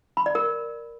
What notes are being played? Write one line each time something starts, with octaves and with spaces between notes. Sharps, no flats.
B5
D5
A#4